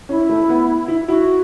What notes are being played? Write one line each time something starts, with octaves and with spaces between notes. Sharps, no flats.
C#4 E4
A3
B3
E4
E4 F#4